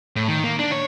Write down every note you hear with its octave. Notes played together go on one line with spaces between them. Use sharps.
A2
D#3
A#3
D4
C#5